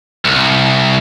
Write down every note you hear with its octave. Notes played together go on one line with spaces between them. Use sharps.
C2